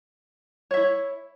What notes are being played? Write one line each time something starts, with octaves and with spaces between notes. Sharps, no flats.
E4 C#5 E5